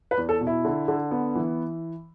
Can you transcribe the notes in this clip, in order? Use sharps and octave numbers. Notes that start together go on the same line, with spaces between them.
B4
E2
A4
B2
E4
D3
D3
B3
E3